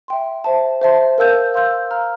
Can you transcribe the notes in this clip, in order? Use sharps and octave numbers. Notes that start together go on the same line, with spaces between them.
E5 G5 C6
C5 E5 A5
C5 E5 A5 C6
A#4 F5 A5 E6 G6
F5 C6 E6 G6
F5 A#5 F6